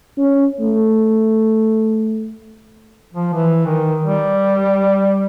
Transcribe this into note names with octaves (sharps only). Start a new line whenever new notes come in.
C#4
A3
F3
E3
D#3
G3